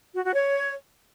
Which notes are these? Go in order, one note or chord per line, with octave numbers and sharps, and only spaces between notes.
F#4
F#4
C#5